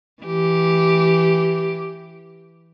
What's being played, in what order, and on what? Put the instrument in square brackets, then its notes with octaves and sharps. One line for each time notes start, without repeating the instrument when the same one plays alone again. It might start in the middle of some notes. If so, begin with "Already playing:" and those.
[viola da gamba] E3 G4